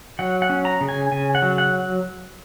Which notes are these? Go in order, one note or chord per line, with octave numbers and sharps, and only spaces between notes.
F#3 F#5
F#5
C#4
A#5
C#3
G#5
C#3 G#5
F#5
F#3
F#5